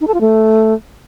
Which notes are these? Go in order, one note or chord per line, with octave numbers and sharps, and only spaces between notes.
D#4
A4
F4
A3